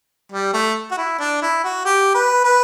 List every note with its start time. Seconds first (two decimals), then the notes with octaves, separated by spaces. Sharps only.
0.32 G3
0.54 A3
0.91 F#4
0.98 E4
1.19 D4
1.42 E4
1.64 F#4
1.85 G4
2.14 B4
2.44 B4